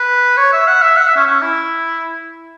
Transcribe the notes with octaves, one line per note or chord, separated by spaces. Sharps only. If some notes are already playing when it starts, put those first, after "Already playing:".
Already playing: B4
C#5
E5
F#5
E5
F#5
E5
C#4
C#4
E4